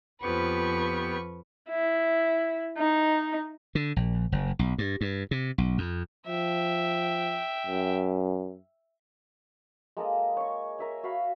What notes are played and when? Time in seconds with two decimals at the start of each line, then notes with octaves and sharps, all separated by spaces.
0.23 F2 F3 B3 G4 B4 C#6
1.70 E4
2.77 D#4
3.75 D3
3.96 A#1
4.32 F#1
4.59 B1
4.78 G2
5.01 G2
5.31 C3
5.58 B1
5.78 F2
6.27 F3 E5 G5
7.66 F#2
9.97 G#3 A#3 A4 D#5
10.37 C#5 C#6
10.79 A#4 E5 G#5
11.03 F#4 E5 F5 B5